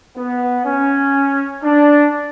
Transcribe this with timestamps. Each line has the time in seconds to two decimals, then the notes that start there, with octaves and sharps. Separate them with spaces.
0.17 B3
0.65 C#4
1.63 D4